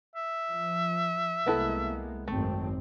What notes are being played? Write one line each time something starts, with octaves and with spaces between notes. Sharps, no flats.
E5
F3
C2 G#3 A#3 B3 E4 A4
G#1 F#2 A3 C4